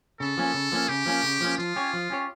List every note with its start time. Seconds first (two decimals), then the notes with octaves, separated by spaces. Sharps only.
0.20 C#3 A4
0.37 F3 A#3 C#4
0.54 C#3
0.72 F3 A#3 C#4
0.88 C#3 G4
1.06 F3 A#3 C#4
1.23 C#3
1.40 F3 A#3 C#4
1.58 F3 F4
1.76 C#4 G4 C#5
1.93 F3
2.10 C#4 G4 C#5